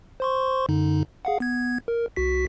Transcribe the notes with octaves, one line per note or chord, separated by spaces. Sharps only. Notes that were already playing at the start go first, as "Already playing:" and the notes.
C5 C6 C#6
F#2 D3 D#4
G#4 F5 F#5
B3 G#6
A#4
C2 F#4 B6